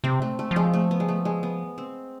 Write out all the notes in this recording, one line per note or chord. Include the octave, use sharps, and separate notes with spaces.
C3 C4
A3
A3
F3
G#3
A3
B3
G#3
A3
G#3
B3
C4